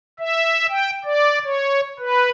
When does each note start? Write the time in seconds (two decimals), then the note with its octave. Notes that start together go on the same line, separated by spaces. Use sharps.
0.19 E5
0.69 G5
1.04 D5
1.44 C#5
1.99 B4